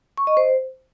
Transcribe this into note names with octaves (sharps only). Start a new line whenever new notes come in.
C#6
D#5
C5